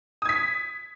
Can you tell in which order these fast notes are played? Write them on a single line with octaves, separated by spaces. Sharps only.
D#6 G#6 B6